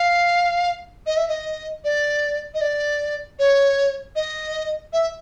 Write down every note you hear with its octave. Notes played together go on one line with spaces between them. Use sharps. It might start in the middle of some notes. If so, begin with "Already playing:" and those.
Already playing: F5
D#5
E5
D#5
D5
D#5
D5
C#5
D#5
E5